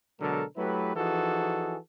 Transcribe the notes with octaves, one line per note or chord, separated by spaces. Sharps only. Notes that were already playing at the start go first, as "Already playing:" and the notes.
B2 D3 F#3 G#3 A4 A#4
F#3 A3 E4 G4 B4
E3 F3 D#4 F#4 G#4 A4